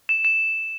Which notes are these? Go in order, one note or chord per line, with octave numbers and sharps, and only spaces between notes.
E7
E7